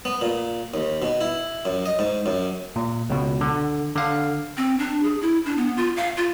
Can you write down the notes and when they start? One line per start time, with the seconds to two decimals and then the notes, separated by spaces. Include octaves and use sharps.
0.05 B3
0.21 A#2
0.74 D#2
1.02 B2
1.21 E4
1.65 F#2
1.86 D#5
1.99 G#2
2.26 F#2
2.76 A#2
3.10 C#2 B2
3.41 D3
3.96 D3 F5
4.57 C4
4.79 D4
5.03 G#4
5.21 E4
5.45 D4
5.57 B3
5.77 F4
5.97 F5
6.17 F4